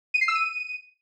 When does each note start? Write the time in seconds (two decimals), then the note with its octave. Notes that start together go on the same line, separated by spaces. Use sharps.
0.14 D#7
0.21 C7
0.28 E6
0.35 D#7